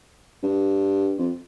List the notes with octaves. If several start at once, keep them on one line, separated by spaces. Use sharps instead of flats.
G2
F2